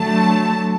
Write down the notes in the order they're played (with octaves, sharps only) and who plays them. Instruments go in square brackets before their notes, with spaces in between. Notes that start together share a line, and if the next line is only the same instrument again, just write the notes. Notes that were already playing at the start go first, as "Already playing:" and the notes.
Already playing: [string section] D3 F#3 A3 A5